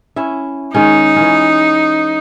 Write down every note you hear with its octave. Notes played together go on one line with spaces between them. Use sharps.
C#4 E4 E5
D#3 G#3 C#4 D#4
E3 C#4